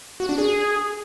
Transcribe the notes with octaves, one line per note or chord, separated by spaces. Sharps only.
F#4
D4
G#4